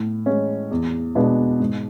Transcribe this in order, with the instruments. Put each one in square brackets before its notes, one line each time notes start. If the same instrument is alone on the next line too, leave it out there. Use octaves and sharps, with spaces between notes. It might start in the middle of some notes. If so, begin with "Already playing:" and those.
Already playing: [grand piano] A2
G#3 C#4
E2
B2 G#3 B3 D4
G#2